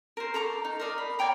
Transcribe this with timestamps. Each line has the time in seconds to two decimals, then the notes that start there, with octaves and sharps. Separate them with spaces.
0.17 A#4 C5
0.34 A4 A#5 C#6 D6
0.65 D#4
0.80 A#4 C5 D5 D#5
0.98 B5
1.19 C#5 D5 G5 A#5